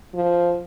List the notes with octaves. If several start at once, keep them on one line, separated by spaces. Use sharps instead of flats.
F3